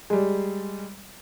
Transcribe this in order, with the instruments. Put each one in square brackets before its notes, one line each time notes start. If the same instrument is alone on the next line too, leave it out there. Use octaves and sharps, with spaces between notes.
[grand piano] G3 G#3